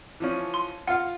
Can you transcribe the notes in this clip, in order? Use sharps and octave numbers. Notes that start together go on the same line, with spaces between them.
E3 F3 C#4
C6
F4 F5 F#5